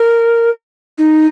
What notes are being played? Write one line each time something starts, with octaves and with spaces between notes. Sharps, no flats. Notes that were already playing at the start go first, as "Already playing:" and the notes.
Already playing: A#4
D#4